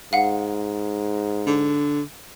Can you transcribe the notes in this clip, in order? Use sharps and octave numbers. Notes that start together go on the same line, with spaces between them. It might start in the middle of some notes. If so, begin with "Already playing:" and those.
G#2 F5 F#5
D3